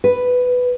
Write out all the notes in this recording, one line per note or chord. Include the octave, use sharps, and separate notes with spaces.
B4